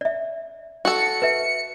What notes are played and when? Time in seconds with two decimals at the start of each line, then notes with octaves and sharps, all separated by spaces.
0.01 D5 E5
0.85 F#4 A4 C#7
1.22 B4 E5